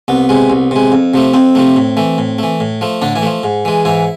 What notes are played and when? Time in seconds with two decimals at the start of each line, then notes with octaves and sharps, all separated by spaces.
0.08 C2 B3
0.29 C3 G#3
0.50 C2
0.71 C3 G#3
0.92 F2
1.14 C3 F3 A3
1.34 F2 C4
1.55 C3 F3 A3
1.76 A2
1.97 E3 A3
2.18 A2
2.39 E3 A3
2.60 A2
2.81 F3 A3
3.02 A2 D3 D4
3.15 E3 E4
3.22 F3 A3
3.43 G#2
3.65 E3 G#3
3.85 G#2 E3 E4